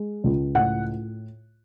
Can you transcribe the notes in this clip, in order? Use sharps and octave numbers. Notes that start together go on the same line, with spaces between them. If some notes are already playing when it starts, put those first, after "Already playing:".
Already playing: G#3
C#2
A2 F#5